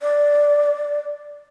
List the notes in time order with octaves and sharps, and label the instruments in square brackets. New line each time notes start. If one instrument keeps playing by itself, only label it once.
[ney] D5